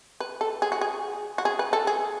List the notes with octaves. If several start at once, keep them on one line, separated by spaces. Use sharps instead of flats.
B4
A4
G#4
F#4
G#4
F#4
G#4
B4
A4
G#4